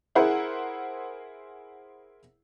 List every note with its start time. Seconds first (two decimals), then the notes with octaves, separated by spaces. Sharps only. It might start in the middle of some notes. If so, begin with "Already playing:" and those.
0.15 E4 G#4 A#4 C5 F#5